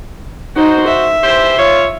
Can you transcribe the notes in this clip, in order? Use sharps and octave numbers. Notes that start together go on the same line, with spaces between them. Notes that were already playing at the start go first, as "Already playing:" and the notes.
D#4 F#4 C5
E5
E3 G4 C5
F4 C#5